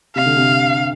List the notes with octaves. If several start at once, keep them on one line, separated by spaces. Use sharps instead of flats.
C3 F5
D3
C3